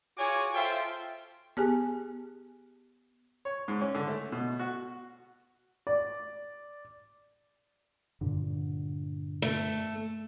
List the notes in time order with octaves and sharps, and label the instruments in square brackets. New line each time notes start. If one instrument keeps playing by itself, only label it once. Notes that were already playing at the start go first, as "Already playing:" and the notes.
[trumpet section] F4 F#4 G#4 C#5 G#5 D6
F4 A4 C5 E5 F5 G5
[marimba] B3 G4 G#4 G#5
[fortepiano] C#5
G#2
C#4
D3
A3
B2
F#4
[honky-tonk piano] D5
[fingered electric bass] G2 A#2 D3
[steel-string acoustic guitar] A3